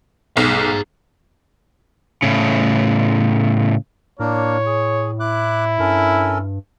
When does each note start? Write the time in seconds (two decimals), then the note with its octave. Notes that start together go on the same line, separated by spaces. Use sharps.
0.37 B1 G#4 A#5
2.22 A2 C#3
4.20 A2 A#3 D4 A#4 C#5
4.66 G#4
5.20 E4 D6 F#6
5.79 G2 C#4 A4 A#4